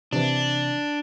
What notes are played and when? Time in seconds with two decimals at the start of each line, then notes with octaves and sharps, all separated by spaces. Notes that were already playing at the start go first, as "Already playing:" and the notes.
0.13 C3 E3 D4